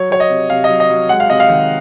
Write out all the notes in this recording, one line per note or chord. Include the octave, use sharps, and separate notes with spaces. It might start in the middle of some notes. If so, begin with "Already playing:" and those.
Already playing: F#3 C#5
F#3 C#5
D#5
C3
C3 F5
D#5
F#3
D#5
F#3
G#3 F#5
F5
C3 D#5
F5
D#3